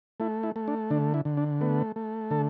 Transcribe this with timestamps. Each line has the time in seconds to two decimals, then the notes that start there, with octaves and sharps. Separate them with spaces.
0.20 A3 E4
0.43 E4
0.56 A3
0.68 D4
0.90 D3 D4
1.14 E4
1.25 D3
1.37 D4
1.61 A3 B3
1.96 A3
2.31 D3 A4